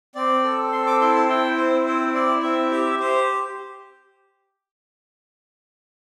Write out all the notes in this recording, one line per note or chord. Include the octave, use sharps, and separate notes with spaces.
C4 D5
A4
C4 C6
D6
E4 C6
A5
E4 G5
C4 C5
E4 C5
E4 D5
C4 E5
G4 E5
G4 C5